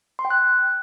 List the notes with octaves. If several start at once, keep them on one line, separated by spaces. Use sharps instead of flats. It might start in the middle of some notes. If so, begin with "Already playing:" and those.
C6
G5
F#6